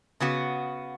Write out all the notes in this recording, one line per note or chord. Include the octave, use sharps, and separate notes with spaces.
C#3 B3 F#4